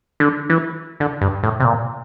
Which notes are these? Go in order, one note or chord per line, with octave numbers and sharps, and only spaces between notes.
D3
E3
D3
G2
A2
C3
A#2